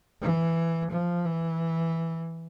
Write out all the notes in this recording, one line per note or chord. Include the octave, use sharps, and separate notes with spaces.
E3
F3
E3